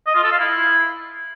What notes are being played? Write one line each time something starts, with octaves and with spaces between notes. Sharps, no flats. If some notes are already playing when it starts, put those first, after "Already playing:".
D#5
F4
A4
F5
E4